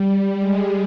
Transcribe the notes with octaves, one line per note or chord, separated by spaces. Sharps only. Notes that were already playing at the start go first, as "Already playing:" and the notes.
Already playing: G3
G#3